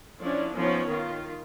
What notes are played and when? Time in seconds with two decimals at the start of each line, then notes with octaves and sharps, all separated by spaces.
0.22 F3 C#4 D4 E4 D5
0.56 F3 B3 C#4 D#4 C#5
0.90 D#3 F4